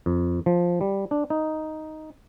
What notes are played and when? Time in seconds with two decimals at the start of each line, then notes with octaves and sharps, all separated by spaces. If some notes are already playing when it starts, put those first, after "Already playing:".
0.06 F2
0.46 F3
0.81 G3
1.11 D4
1.30 D#4